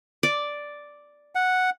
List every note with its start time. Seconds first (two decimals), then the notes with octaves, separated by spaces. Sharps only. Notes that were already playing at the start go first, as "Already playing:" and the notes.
0.23 D5
1.35 F#5